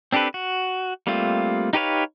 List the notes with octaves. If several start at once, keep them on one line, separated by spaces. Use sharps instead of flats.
C4 D4 G4 A4 B4
F#4
G3 A3 A#3 C4 F4
D#4 G4 B4 C#5 F5